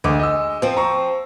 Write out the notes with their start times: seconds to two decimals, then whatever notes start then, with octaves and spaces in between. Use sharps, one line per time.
0.04 D2 G#3 D#5 D6
0.19 D#5 E6
0.62 F3 C4 C5
0.77 A#5 C#6